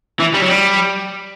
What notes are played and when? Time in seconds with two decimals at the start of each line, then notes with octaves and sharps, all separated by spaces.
0.20 E3
0.34 G3
0.41 F#3
0.49 G3